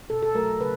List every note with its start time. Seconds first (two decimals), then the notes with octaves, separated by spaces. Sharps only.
0.10 B2 A4
0.22 A4
0.35 F#3 A3 A#4
0.60 C#3 B4